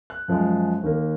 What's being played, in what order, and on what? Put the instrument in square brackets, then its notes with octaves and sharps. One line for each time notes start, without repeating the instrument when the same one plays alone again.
[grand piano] F#6
F#2 F3 G#3
D#2 D#3 A#3